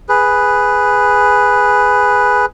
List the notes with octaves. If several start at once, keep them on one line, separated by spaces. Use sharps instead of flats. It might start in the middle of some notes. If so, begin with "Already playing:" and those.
G#4 B4